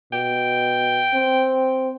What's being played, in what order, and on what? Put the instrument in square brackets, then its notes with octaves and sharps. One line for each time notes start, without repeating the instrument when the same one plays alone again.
[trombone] B2 [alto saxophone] G5
[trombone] C4